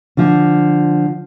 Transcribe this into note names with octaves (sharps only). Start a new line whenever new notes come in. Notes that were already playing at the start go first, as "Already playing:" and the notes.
D3 F3